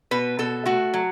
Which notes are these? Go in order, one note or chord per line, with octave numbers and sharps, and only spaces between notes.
B2 B4
B2 A4
A3 F#4
F#3